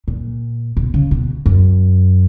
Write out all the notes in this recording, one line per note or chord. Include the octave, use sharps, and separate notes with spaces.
A#2
B2
C#3
B2
F#2